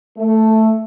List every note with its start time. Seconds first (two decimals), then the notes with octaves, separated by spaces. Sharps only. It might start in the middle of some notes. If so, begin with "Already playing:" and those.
0.18 A3